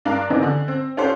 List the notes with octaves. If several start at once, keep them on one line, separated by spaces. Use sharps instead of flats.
G2 D4 A#4 F5
D#3 E3 B3 C4 D4 D#4
D3
C4
C#4 D4 F4 G4 A4 C5